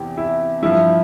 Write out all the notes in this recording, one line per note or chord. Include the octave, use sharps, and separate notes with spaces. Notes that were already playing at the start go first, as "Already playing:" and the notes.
Already playing: E2 C3 E3 G4
E4
G2 F3 E4